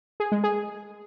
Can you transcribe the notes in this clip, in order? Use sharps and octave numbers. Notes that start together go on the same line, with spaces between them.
G#4
G#3
G#4